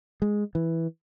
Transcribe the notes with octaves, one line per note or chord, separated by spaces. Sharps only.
G#3
E3